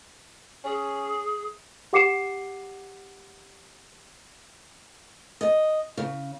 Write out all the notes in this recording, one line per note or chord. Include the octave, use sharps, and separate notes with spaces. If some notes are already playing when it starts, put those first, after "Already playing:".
C#4 G#4
G4 F#5 D6 C7 C#7 E7
D#5
C#3